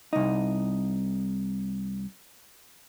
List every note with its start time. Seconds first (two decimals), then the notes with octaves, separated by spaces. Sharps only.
0.13 C2 D#4